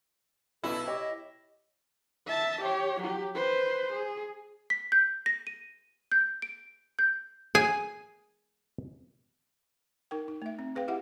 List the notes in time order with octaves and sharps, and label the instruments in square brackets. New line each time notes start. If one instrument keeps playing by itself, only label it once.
[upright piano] B1 B2 B4 [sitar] E4 [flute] A4
[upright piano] G4 C#5 D6 [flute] D#5
[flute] D#5
[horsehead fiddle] E5 A5
G4 C#5
F#3 G4
B4 C5
G#4
[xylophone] B6
G6
A#6
D#7
G6
D7
G6
[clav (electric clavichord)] G#4 [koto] G#5
[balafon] D#4 A#4 G5
D#4
A3 E5
C4
G#4 B4 F5 G5
E4 G4 E5 F#5